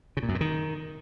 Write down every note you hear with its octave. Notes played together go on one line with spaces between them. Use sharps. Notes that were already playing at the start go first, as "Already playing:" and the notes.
C#3
A#2
F#2
A#2
D#3